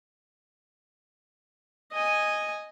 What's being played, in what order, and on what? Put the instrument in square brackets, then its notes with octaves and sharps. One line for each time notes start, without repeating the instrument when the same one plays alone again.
[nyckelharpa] D#5 G#5